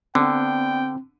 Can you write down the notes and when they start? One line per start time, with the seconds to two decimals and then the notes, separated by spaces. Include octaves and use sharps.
0.15 D3 B3 C4 D4 G5